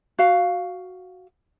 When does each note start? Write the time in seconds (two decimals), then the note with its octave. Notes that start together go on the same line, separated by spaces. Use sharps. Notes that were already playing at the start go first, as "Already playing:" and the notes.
0.19 F#4 F5